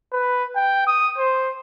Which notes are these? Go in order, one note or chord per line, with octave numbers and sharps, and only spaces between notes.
B4
G5
D#6
C5